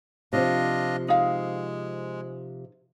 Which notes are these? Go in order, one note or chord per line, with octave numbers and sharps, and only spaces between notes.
C3 F3 D4 F4 D#5
G#3 D#4 F5